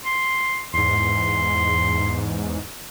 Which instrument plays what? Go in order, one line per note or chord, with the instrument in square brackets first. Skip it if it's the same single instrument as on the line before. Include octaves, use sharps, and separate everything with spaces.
[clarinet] C6
[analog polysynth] E2 G#2 [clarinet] C6